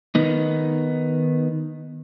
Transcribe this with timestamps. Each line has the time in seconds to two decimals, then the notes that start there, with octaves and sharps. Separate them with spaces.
0.15 D#3 B3 D#4